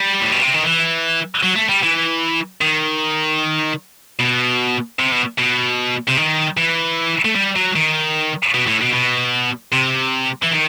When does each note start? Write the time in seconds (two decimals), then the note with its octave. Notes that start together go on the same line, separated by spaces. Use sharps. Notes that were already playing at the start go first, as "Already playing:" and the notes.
Already playing: G3
0.21 A2
0.32 B2
0.42 C3
0.54 D#3
0.64 E3
1.43 F#3
1.56 A3
1.69 G3
1.83 E3
2.61 D#3
4.20 B2
4.99 C3
5.12 B2
5.38 B2
6.08 C3
6.17 D#3
6.57 E3
7.25 A3
7.36 G3
7.56 F#3
7.76 D#3
8.54 B2
8.68 A2
8.81 B2
8.93 B2
9.73 C3
10.43 E3
10.52 D#3